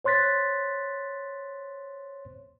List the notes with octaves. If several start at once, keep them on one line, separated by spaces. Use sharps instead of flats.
C5 C#5 C6 F#6 A6 B6